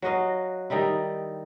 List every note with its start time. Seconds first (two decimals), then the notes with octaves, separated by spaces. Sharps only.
0.02 F#3 F#4 D#5 F5
0.70 D#3 G3 D#4 E4